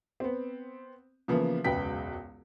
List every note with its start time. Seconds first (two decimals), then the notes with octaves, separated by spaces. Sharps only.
0.20 B3 C4
1.28 C#3 E3 F3 A#3 B3
1.64 E1 C#2 F#2 B4 G5 B6